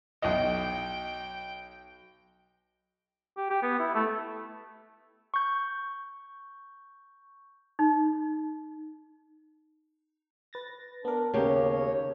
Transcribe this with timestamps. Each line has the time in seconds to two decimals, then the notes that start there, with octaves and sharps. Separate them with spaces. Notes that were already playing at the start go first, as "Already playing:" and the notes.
0.22 B1 D#5 G5
3.37 G4
3.50 G4
3.63 B3
3.79 E4
3.95 A3
5.34 C#6 G6
7.79 D#4
10.53 B4 A6 A#6
11.05 B3 D4 A#4
11.34 D#2 C#3 A#3 G4 C#5